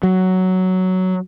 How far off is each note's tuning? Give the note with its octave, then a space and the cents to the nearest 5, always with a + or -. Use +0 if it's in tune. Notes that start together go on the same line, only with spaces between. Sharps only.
F#3 +5